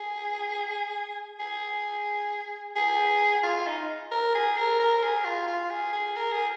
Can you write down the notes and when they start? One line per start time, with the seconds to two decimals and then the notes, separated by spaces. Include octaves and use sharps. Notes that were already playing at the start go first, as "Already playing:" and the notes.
Already playing: G#4
1.39 G#4
2.76 G#4
3.43 F4
3.67 D#4
4.11 A#4
4.35 G#4
4.58 A#4
4.80 A#4
5.03 G#4
5.24 F4
5.48 F4
5.70 G#4
5.93 G#4
6.16 A#4
6.32 G#4